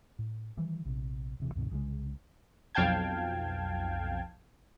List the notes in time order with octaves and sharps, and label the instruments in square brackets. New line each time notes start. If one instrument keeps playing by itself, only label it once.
[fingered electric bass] A2
D#3 E3 G3
A#1 C3
D#1 C3 E3
C#2 G2 B2 D3
C2 C#3 E3 G#3
[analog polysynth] B1 F2 F5 G5 A5 G#6